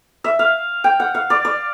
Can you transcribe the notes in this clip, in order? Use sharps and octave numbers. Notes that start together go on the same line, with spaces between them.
E5
F5
G5
F#5
F5
D5
D5